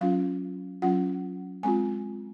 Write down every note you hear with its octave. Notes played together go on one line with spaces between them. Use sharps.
F#3 C#4 F4 F5
F#3 C#4 F4 F#5
G#3 C4 F4 G#5